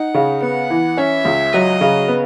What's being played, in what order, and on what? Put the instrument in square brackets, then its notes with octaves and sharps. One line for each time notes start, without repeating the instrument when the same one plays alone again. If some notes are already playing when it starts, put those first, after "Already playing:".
Already playing: [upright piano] D#4 [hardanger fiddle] F#5
[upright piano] C#3
[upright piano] B3 [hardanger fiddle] F#5
[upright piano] E3
[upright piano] C#4 [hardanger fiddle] E5
[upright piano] C#2
[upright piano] F#3 [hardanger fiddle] D#5
[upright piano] C#3
B3